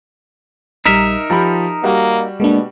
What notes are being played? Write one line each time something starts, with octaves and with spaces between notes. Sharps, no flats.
A#1 G3 D#4 A#4 E5
F3 G4 A#5 B5
G3 A#3 F#4
B2 G#3 A#3 D4